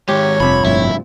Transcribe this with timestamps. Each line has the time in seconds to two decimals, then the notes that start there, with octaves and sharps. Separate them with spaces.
0.09 D#3 G#3 G4 C#5
0.40 F1 G2 C3 F3 B5
0.65 G1 F2 A2 E4